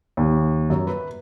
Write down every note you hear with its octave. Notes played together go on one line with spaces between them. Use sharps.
D#2
F#2
B4